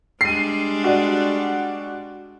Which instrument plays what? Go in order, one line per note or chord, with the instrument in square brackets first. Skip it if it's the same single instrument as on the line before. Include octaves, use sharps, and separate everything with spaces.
[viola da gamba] G3 G#3 D4 [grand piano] C7 D#7
[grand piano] F#4 D5